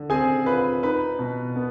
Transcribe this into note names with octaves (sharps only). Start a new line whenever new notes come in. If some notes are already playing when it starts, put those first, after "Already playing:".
Already playing: D3
C4 G#4 G#5
F4 B4 B5
D#4 B4 B5
B2
B3